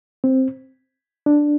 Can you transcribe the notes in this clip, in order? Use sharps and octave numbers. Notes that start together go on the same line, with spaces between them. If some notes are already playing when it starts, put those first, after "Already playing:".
C4
D4